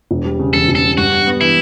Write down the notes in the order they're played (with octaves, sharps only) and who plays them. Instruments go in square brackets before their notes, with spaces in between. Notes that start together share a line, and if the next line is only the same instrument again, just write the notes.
[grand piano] E1
G3
C#3
[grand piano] E2 [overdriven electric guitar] A4
[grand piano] E1
[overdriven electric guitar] A4
[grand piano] G3
[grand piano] G2 [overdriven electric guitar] F#4
[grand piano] G2
B3
[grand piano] E3 [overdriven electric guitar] E4